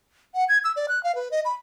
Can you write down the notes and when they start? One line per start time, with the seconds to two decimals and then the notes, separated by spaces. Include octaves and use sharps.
0.35 F#5
0.49 G#6
0.64 E6
0.76 D5
0.89 F#6
1.04 F5
1.15 B4
1.31 D#5
1.45 B5